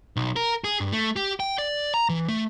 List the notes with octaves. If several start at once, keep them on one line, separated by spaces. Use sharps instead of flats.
B1
A#4
G#4
G2
A3
G4
G5
D5
A#5
E3
A3